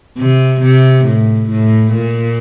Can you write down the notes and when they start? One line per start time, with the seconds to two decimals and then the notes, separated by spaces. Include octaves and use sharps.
0.18 C3
0.61 C3
1.06 A2
1.50 A2
1.93 A#2